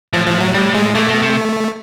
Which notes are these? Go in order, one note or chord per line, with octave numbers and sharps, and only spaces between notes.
A2 F3
F3
F#3
A2 G3
G#3
A#2 A3
B2
C3